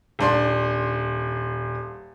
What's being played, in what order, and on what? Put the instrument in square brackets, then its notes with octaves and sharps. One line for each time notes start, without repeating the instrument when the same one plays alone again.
[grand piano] D#1 D4 C6